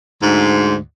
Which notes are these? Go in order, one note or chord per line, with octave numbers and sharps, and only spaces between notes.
D2 G#2